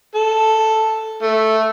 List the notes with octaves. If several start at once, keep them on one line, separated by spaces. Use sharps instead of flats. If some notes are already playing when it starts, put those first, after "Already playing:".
A4
A3